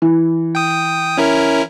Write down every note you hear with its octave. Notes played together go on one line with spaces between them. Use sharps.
E3
G5 D#6
C#4 E4 A#4